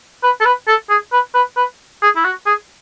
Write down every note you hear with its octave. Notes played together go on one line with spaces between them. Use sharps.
B4
A4
B4
A4
G#4
B4
B4
B4
G#4
E4
F#4
G#4